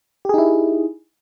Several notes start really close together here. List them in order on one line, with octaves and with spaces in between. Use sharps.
G4 G#4 D#4 E4